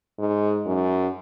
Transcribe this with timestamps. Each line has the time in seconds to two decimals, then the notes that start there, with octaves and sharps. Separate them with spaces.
0.18 G#2
0.66 F#2